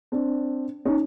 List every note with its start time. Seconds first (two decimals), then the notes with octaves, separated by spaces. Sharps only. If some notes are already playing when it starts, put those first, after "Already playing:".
0.12 C4 D4
0.85 C#4 D#4